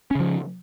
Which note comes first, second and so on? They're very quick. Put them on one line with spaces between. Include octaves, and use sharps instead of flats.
C#4 C#3 F3